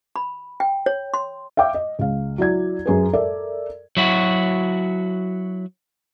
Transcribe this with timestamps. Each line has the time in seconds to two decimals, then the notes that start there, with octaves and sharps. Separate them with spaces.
0.16 B5
0.60 G5
0.86 C#5
1.14 C6
1.57 E5 F5 G5 D6
1.74 D#5
1.99 C#2 F5
2.38 F#3 E4 D5 G#6
2.86 F#2 G#4 B4
3.13 A4 A#4 D5 E5
3.97 F#3 E4 F#4